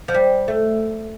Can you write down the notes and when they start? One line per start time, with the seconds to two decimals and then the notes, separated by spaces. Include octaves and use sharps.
0.08 F3
0.14 G3
0.48 A3